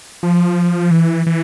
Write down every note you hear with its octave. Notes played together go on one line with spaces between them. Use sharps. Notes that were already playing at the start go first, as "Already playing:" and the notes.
F3
E3
E3